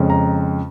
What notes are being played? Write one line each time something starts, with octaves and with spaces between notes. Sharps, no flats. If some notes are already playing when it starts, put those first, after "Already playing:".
Already playing: F2 C#3 G#3 C#4
A#5